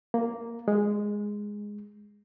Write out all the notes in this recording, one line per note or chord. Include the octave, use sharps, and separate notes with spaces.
A#3
G#3